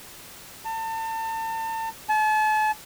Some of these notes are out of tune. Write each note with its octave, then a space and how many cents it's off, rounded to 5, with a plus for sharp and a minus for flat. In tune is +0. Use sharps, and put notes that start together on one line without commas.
A5 +35
A5 -40